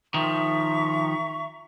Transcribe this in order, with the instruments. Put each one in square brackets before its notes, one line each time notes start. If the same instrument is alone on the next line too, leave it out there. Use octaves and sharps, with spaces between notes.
[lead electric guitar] D#3 F3 [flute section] E5 A#5 C#6